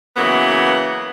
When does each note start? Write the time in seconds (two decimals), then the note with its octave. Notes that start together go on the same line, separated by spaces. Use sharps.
0.17 C#3 E3 F#3 A#3 B3